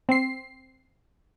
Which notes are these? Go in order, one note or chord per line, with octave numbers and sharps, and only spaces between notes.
C4 C7